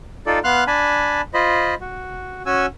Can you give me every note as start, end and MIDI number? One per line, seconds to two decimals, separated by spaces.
0.26 0.39 63
0.26 0.39 65
0.26 0.39 69
0.26 0.39 74
0.44 0.64 59
0.44 0.64 77
0.44 0.64 84
0.44 0.64 89
0.44 0.64 90
0.67 1.21 62
0.67 1.21 80
0.67 1.21 81
0.67 1.21 83
1.34 1.75 65
1.34 1.75 72
1.34 1.75 75
1.34 1.75 83
1.81 2.42 66
2.46 2.66 61
2.46 2.66 66
2.46 2.66 80
2.46 2.66 88